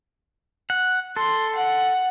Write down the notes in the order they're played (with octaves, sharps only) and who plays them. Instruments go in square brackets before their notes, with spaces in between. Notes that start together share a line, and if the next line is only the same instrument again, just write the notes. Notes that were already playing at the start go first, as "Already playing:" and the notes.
[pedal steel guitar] F#5
[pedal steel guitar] A4 [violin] C6
[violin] F#5